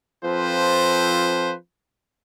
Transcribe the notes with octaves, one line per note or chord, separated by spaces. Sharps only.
F3 C4 F4 A4 B4 C5